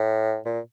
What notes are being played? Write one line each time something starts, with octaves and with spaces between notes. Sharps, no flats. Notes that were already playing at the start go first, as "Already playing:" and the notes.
Already playing: A2
A#2